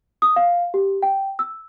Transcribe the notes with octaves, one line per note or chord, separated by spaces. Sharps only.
D#6
F5
G4
G5
E6